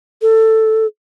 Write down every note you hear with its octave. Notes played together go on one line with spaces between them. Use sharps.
A4